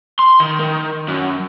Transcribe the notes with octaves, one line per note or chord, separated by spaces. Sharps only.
C6
D#3
D#3
F#2